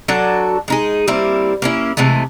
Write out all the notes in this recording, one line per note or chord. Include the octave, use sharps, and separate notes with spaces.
F#3 D4 F#4 A4
G#3 D#4 G#4
G3 A#3 C4 E4
A#3 C#4 E4
C3 E3 G#3 A3